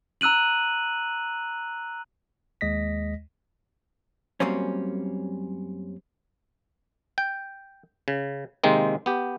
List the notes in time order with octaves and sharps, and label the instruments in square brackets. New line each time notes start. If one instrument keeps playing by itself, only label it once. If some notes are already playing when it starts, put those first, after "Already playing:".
[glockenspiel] A#5 E6 F#6 D#7 F#7
[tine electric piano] D#2 G#3 D#5 A#6 B6
[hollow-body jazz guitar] F#2 G3 A#3 C4 C#4
[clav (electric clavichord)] G5
C#3
C3 D#3 G#3 A#3 C4
B3 G4